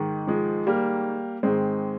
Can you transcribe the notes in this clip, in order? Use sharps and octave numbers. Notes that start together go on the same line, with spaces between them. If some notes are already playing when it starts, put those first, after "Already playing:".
Already playing: G#2 D#3
F3 G#3
G3 A#3
G#2 D#3 G#3 C4